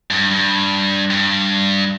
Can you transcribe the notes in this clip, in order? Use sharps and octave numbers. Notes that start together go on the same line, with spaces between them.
G2
G2
G2